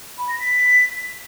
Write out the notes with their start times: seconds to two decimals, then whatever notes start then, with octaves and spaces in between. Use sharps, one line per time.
0.18 B5
0.29 A#6
0.39 B6